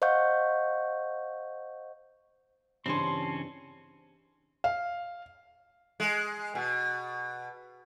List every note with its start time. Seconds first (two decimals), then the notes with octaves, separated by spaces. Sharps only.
0.02 C5 D#5 F5 F#5 C#6 G6
2.86 G2 C#3 E3 C4 C#4 C5 A5 C6
4.64 F5
6.00 G#3
6.55 B2